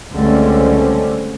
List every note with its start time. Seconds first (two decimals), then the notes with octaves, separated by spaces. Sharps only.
0.11 C#2 D3 G3 A3 C4 C#4